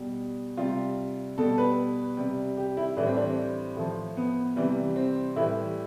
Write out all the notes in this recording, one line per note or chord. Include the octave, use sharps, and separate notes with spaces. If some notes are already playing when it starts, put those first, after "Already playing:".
Already playing: B2 G3
C3 G3 F4
B2 G3 A4
B4
C3 G3
G4
E4
A2 E3 G3 D4
C4
D4
C4
A2 F3
B3
C3 E3 G3
C4
A2 E3 G3 E4